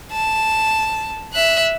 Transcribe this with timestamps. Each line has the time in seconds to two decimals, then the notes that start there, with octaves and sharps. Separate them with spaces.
0.12 A5
1.33 E5 F#6